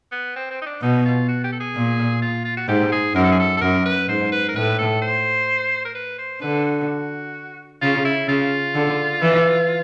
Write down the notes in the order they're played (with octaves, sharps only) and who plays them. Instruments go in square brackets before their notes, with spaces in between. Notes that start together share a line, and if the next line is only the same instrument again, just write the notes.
[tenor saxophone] B3
C4
C4
D#4
D4
[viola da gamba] B2 [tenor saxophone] D#4
[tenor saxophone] F4
F#4
G4
A4
G#4
[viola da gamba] A#2
[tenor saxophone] F4
F4
F#4
[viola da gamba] G#2 [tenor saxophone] G4
[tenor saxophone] G#4
[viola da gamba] F#2 [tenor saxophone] A#4
[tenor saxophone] A4
G#4
A4
A4
[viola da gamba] F#2 [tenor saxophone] A#4
[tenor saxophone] B4
[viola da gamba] G#2 [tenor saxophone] C5
[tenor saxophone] B4
A#4
[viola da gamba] A2 [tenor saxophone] B4
[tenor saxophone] A4
C5
A#4
B4
C5
[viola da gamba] D3 [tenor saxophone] B4
[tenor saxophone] F#4
[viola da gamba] C#3 [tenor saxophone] F4
[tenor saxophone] E4
[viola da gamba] C#3 [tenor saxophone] F4
[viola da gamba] D3
E3